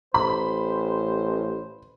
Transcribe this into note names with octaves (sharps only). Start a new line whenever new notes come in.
A1 C5 B5